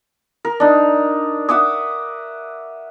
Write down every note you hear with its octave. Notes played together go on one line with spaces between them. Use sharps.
A#4
D4 D#4
E5 F#5 D6 D#6